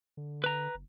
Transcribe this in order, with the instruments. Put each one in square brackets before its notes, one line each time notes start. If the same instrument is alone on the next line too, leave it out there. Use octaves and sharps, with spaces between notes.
[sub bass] D3
[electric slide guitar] B4 A#5
[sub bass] F#1